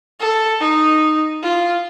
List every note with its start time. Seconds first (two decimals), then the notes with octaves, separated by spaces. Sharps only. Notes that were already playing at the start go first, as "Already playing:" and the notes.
0.20 A4
0.61 D#4
1.43 F4